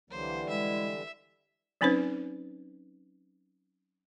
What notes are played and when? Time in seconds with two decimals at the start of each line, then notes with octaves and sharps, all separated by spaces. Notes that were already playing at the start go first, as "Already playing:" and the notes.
0.11 C2 D3 E3 F#3 G3 A#3 C5
0.49 G#3 E4 E5
1.81 F#3 C4 C#4 D#4 B4 C5